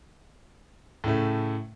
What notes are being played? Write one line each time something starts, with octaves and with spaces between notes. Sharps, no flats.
A2 C#3 A3